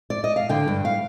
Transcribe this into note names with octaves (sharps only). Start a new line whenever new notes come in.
D5
D#5
F5
D3 G5
G2
F5